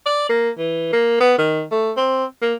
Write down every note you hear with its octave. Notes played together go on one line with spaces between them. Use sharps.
D5
A#3
E3
A#3
B3
D#3
A3
C4
A#3